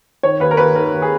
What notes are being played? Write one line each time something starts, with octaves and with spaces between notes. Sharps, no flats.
D#3 C#5
D#2 B4
A#4
D#2 B4
D#3 A#4
D#2
G#4